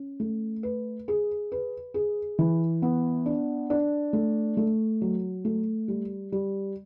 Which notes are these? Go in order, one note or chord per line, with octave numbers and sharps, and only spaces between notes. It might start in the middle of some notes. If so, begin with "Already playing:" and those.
Already playing: C#4
A3
B4
G#4
B4
G#4
E3
B3
D4
D4
A3
A3
F#3
A3
G3
G3